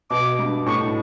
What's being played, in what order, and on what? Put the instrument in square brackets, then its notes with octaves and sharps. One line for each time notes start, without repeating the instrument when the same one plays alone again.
[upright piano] B2 [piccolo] D6
[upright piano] G2
[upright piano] A2 [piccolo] C#6